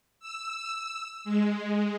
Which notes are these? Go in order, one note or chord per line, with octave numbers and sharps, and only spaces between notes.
E6
G#3